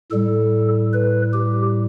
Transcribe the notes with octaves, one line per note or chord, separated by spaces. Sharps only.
A2 G3 A4
B4
G4